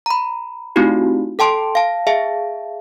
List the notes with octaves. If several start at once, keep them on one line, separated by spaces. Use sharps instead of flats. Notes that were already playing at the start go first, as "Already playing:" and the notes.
A#5 B5
A3 C4 D#4 E4 F#4 G4
A4 G5 A5 C6 D7
F5 A5
G#4 E5 F5 A5